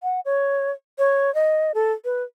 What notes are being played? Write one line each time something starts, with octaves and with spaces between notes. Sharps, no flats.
F#5
C#5
C#5
D#5
A4
B4